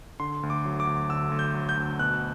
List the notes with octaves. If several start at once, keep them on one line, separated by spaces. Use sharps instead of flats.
D3 C6
D2
D6
F#3
D6
D2
D3 E6
D2
G6
F#3
G6
D2
B2 F#6